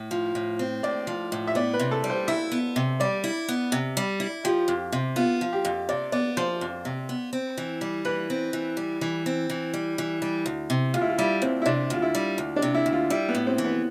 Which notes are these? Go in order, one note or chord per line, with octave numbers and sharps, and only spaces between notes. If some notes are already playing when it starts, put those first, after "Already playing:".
Already playing: A2
F3
A2
C4
A2 D5
F3
A2
E5
B3 D5
B4
C3
A4
G3
C5
E4 E5
B3
C3
G3 D5
E4
B3
C3
G3
E4
F3 G4
F2
C3
B3 F4
F3
G4
F2
C3 D5
B3 D5
F3 C5
F2
C3
B3
C4
E3
G3
E3 B4
C4
E3
G3
E3
C4
E3
G3
E3
G3
D2
C3
D2 F4
E4
F4
G3 E4
D2 C4
E4
C3 D4
D2 F4
E4
G3
D2
D4
C3
E4
D2
F4
G3 E4
B3
A2
C4
E3
B3